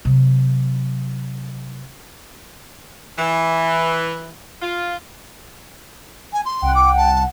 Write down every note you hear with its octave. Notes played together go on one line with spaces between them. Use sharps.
C3 F#3
E3
F4
G#5
C6
C2 F#5 G5
D6
A5